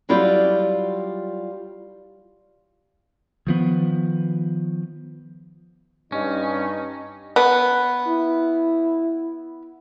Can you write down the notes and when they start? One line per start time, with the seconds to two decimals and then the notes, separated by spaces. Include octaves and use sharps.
0.09 F#3 G3 E4 F4 G4 D5
3.47 D#3 F3 B3
6.12 G2 C#4 D#4 D#5
7.36 B3
8.08 E4